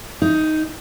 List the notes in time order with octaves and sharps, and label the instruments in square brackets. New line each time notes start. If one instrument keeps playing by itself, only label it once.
[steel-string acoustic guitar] D#4